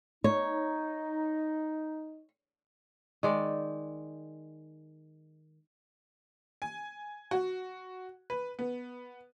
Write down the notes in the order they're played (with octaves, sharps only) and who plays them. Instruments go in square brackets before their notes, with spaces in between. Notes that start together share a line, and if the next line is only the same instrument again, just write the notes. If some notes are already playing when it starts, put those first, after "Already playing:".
[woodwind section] D#4 [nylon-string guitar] C#5
[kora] D#3 G#3 D5
[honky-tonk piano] G#5
F#4
B4
B3